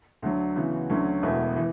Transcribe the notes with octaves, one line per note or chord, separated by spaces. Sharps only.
D2 D3 F#3
C#3 E3 B3 F#4
D2 D3 F#3 C#4
E1 E2 B2 A3 E4
E3